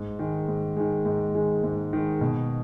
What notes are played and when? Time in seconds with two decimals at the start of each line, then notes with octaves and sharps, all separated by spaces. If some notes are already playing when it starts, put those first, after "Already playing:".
Already playing: G#2
0.19 D#3 G#3
0.48 G#2
0.77 D#3 G#3
1.05 G#2
1.35 D#3 G#3
1.64 G#2
1.93 D#3 G#3
2.21 B2